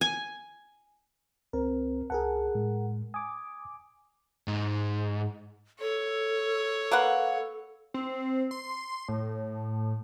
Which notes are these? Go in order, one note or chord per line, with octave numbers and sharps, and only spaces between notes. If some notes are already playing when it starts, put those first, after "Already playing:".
G#5
C#2 C4 A#4 C5
C2 G#4 A#4 F#5 A5
A2 G#3
G#5 D6 D#6
G#2
A4 C#5
A#3 B4 F#5
C4
C6
A2